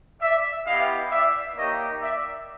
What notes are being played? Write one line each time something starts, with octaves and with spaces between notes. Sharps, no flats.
D5 E5
B3 E4 G4 D#5 F5
D5 E5
A#3 D#4 G4 C#5 D#5
D5 E5